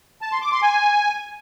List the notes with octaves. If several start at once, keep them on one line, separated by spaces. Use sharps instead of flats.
A5
C6
D6
C6
G#5